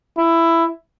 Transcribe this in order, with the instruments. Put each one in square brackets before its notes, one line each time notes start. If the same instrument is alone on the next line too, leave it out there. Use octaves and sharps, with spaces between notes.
[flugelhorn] E4